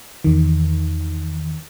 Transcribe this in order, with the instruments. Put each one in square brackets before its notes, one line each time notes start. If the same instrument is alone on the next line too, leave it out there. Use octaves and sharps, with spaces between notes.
[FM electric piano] E2 D#3